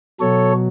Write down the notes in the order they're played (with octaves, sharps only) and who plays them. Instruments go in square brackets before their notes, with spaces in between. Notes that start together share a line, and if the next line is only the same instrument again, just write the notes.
[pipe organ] B2 F#3 A4 C#5